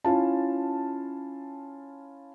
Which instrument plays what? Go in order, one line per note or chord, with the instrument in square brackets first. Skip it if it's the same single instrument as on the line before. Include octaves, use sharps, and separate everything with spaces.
[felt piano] C#4 E4 F4 A5